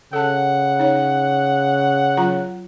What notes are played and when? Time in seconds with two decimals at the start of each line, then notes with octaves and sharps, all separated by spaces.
0.13 C#3 A4 F#5 A5
0.79 D#4 C#5
2.17 F#3 F4 A#5